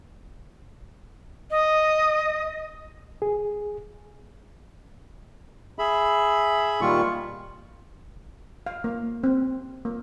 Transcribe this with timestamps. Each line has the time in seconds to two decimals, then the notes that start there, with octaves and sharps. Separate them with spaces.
1.51 D#5
3.22 G#4
5.79 G#4 E5 B5
6.81 A#2 D#3 G3 F4 C#6
8.66 F5
8.84 A#3
9.24 C4
9.85 A#3